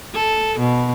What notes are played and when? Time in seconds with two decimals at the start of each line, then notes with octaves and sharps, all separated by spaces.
0.14 A4
0.59 B2